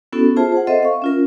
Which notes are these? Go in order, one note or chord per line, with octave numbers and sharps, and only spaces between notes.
B3 C#4 E4 F#4 A4
F4 G#4 C5 E5 A5
C5 F#5
C4 A4 C5 D#5 E5
F5 C#6
C#4 F4 A#4